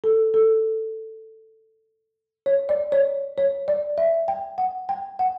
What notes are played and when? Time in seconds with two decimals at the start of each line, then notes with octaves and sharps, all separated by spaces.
0.04 A4
0.34 A4
2.46 C#5
2.69 D5
2.92 C#5
3.38 C#5
3.68 D5
3.98 E5
4.28 G5
4.58 F#5
4.89 G5
5.19 F#5